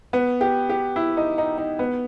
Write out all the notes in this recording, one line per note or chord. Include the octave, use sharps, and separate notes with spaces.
B3
G4
G4
E4
D#4
D#4
D#4
B3